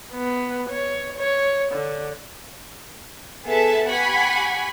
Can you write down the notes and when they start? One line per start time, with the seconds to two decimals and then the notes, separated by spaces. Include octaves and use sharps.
0.12 B3
0.69 C#5
1.17 C#5
1.72 D3
3.45 B3 G#4 A4 B4 E5 A5
3.87 G4 F#5 G#5 B5 C#6